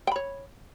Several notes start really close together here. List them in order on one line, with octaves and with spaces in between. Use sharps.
G5 B5 C#5